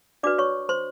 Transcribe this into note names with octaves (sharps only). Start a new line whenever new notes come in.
D4 F#4 B4 D5 D6
C#5 C#6
C5 C6